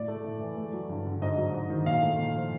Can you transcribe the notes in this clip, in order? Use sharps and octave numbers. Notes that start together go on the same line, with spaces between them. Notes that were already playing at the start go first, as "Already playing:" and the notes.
Already playing: A2 D5
A3
A2
E3
A3
F#3
G2
D3
G#2 D#5
F#3
G#2
D#3
A#2 F5
A3
A#2
F3